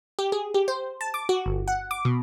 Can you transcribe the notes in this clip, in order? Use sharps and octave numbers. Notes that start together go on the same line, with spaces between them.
G4
G#4
G4
C5
A5
D6
F#4
G1
F#5
D6
B2